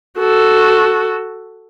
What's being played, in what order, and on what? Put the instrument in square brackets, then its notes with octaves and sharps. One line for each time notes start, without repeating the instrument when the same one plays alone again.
[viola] F#4 A4